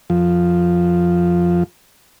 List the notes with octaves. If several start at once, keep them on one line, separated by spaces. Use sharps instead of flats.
F2 F3